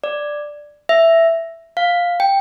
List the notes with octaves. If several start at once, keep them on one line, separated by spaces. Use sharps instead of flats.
D5
E5
F5
G5